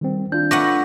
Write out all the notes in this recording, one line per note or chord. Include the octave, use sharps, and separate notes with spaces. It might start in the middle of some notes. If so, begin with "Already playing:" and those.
D#3 G3 C4
D4 F4 G6
A3 B4 F#5 C#6 D6 A#6